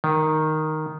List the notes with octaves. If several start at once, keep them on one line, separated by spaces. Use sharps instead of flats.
D#3